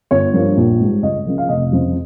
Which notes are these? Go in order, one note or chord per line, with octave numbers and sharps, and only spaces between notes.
G1 C#5
G2 F3 A#3
A#1
G#2 G3
C#2 D#5
C#3 F3 A#3
F5
F1 D#5
F2 C#3 F3